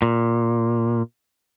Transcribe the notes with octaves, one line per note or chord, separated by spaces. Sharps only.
A#2